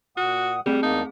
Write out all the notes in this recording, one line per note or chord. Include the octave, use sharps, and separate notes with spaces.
A#2 F#4 F#5 D#6
G3 A3 C4 G#4
E2 A#3 D#4 A5